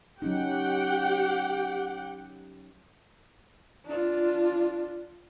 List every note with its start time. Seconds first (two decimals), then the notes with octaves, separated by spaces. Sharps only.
0.22 F#3 C#4 D#4 G4 F#5 G5
3.86 D4 F4